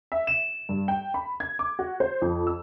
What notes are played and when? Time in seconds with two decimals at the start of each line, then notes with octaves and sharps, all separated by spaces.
0.12 E5
0.27 E7
0.69 G2
0.88 G5
1.14 B5
1.40 G#6
1.59 D6
1.79 F#4
2.00 C5
2.22 F2
2.47 E6